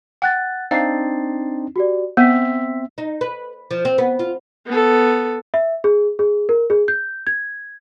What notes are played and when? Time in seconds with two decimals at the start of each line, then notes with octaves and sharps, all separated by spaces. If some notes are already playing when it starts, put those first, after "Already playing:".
0.22 F#5 G5 F#6 A6
0.71 C4 D4 D#4 F5 A6 C7
1.76 F#4 G4 D5
2.17 B3 C4 E5 E6 B6
2.98 D#4
3.21 B4
3.71 F3
3.85 C4
3.98 B3
4.19 F4
4.67 B3 A4
5.54 E5
5.84 G#4
6.19 G#4
6.49 A#4
6.70 G#4
6.88 G6
7.27 G#6